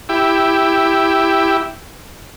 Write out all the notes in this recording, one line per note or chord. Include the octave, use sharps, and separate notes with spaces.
E4 G4